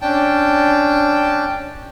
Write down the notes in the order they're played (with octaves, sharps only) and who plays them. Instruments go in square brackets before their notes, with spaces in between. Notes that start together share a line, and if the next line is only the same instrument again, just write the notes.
[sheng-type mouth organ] C#4 D4 G5 A5